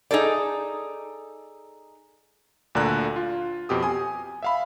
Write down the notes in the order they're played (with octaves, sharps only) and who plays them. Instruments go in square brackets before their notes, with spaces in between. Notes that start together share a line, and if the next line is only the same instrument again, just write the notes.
[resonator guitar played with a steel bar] D#4 G#4 A4 D5
[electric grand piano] D2 A#2 D3 A#5 F#6
F4
F2 B2 G4 D#6
G#5 D#6
E5 F5 B5